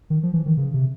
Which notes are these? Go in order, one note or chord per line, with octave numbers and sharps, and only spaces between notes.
D#3
F3
E3
D#3
C#3
C3